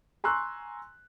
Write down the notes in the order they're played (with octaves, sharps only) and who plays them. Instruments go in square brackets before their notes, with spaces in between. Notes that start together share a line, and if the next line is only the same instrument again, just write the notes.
[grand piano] G#5 A#5 C6 C#6 E6 F#6